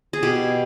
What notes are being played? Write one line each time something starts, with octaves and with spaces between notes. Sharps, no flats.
G#4
B2 G4